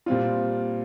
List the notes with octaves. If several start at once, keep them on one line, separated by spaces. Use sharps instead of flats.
A#2 G3 C4 F4